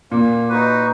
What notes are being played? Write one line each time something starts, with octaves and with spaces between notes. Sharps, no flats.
A#2 A#3
D#4 F#4 B4